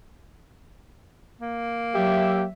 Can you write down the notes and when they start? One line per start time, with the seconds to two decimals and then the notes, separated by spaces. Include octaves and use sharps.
1.42 A#3
1.95 F#3 G4 E5